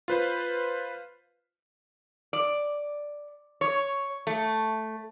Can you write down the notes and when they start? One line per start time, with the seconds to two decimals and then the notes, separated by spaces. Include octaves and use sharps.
0.08 F4 B4 C5
2.33 D5
3.61 C#5
4.27 A3